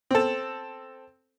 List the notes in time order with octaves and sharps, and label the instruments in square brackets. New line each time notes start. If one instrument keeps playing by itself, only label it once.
[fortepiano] C4 A4